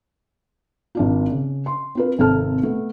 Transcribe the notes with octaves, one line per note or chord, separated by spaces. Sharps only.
G#1 D4 F4
C#3
C6
C4 F4 B4
G#1 C3 C4 A4 A5 F6
A3 B3